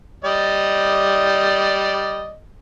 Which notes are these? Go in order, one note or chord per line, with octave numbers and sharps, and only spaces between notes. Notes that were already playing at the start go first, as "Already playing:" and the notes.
G3 D5 D#5